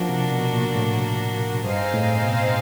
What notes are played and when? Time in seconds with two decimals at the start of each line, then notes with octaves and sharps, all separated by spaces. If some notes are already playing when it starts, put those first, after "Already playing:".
Already playing: F3 A#3 D4 F#4
0.09 C3
0.31 B2
0.52 A#2
0.76 A2
1.63 G2 C4 D#4 G#4 C5 F5
1.93 A2
2.23 B2